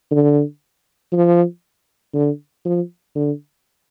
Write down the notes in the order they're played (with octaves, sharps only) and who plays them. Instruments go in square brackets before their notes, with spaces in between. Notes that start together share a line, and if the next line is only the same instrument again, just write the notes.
[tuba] D3
F3
D3
F3
D3